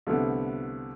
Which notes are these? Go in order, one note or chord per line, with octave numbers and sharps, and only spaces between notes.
C2 D3 F3 A3 B3